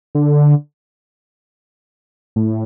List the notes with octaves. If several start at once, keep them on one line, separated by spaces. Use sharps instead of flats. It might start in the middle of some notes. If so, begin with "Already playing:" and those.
D3
A2